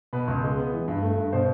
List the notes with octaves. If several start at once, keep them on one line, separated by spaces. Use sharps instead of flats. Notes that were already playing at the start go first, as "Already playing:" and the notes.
B2 B4
C#2
G#3
B3
E3
G2
A3
G2
B2 C5